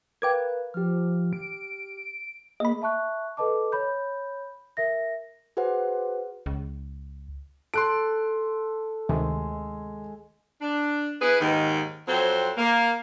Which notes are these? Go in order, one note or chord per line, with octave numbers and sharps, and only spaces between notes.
A#4 B4 F5 G5 D6 G#6
F3 G4 F6
D7
A#3 G#4 D#5 B5
E5 A5 C#6 F#6
A4 B4 D#5 A5 D6
C#5 B5 G6
A#4 E5 A#6
F#4 G#4 B4 C5 F#5
C#2
A4 C6 F#6 D7
D2 C3 D#3 G#3
D4
E4 G#4 B4
D#2 G#2 D#3
F2 F#3 C4 C5
A#3